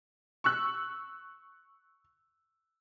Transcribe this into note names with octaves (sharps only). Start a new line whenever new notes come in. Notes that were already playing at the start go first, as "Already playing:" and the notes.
C#6 E6 F#6